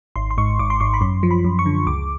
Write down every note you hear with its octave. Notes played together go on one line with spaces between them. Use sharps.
G#1 C6
C6
G#2 C#6
G#1 D6
C6
G#1 C#6
B5
F#2 C6
F3
B5
F#2
C#6
D3
C#2 D6